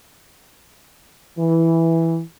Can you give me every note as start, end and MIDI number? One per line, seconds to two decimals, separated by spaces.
1.38 2.19 52